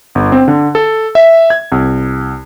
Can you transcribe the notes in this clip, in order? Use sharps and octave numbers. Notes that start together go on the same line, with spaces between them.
G1
C4
D3
A4
E5
G#6
C2